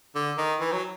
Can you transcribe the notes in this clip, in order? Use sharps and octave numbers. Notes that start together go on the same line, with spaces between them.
D3
D#3
E3
F#3